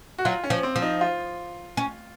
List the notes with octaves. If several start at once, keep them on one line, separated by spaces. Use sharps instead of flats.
F#4
F#3 F4
C#4
F3
C4
F3
D#4
F4
C#4